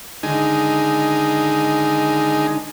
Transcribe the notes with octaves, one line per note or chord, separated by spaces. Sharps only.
D3 D#3 G#3 D#4 G#5